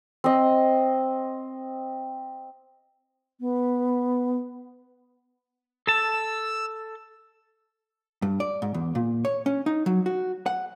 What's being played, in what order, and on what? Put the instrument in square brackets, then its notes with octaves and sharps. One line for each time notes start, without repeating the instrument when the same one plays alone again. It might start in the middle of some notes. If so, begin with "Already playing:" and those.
[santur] C4 D#5
[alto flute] B3
[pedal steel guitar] A4 A5 [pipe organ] E6
[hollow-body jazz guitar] G2
D5
G#2
E2
A#2
C#5
C#4
D#4
F#3
F#4
F#5